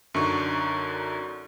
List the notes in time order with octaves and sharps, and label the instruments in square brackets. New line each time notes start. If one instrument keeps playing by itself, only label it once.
[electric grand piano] F#2 D3 D#4 C#6